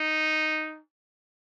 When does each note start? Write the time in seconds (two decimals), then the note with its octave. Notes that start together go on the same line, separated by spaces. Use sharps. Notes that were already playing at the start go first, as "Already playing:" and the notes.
Already playing: D#4